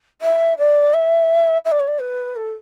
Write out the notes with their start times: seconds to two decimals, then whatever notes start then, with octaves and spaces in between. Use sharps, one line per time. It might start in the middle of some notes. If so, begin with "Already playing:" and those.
0.21 E5
0.58 D5
0.93 E5
1.65 E5
1.71 D5
1.79 C#5
1.87 D5
2.00 B4
2.36 A4